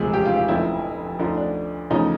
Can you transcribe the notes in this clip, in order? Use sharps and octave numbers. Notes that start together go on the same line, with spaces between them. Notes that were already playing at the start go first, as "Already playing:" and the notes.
Already playing: E1 D2 C3 F3 G#3 G#4
G4
F4
F4
F1 F2 D3 F3 E4
D2 D3 F3 D#4
D4
E2 C#3 F3 A3 D#4